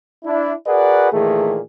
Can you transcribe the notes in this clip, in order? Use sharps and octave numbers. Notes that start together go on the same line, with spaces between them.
D4 E4
F#4 G#4 A#4 B4 D5 F#5
A#2 D#3 E3 A3 G#4